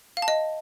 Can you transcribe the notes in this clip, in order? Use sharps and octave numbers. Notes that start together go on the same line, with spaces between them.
F5
A5
D#5